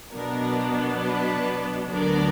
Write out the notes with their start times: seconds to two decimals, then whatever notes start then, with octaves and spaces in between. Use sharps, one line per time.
0.13 B2 F#3 B3 D4 A#4
1.03 B4
1.92 D2 D3 F#3 B3 D4 A#4 D5